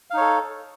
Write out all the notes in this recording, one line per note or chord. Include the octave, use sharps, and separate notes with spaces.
D#4 A4 C#5 F5